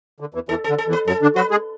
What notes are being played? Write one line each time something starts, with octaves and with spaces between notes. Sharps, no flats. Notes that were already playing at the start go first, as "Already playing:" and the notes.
D3
E2 E3
E2 E3 A4
A4
D3
A4
E2 E3
B4
F#2 F#3 A4
D3 D4
F#3 F#4 B4
G#3 G#4